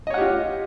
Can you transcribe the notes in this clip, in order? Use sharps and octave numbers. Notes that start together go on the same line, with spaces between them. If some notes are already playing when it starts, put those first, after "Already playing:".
F4 G4 C#5 D#5 F#5